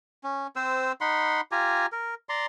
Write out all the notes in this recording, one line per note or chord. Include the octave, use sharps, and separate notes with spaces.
C#4
C4 C5 E6
D#4 F#5 B5 C6
F4 G4 G#5 A#5
A#4
D5 A#5 C6